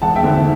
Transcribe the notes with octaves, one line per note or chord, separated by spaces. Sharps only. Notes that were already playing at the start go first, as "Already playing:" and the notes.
E1 F#5 A5
E5 G5
D2 D3